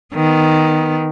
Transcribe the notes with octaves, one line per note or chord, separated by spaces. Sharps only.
D#3 B3